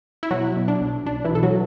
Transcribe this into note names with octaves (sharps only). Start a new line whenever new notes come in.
E4
B2 F#3 F#4
B2
D4
B1
B1 D4
E3 E4
B2 A4
F#3 F#4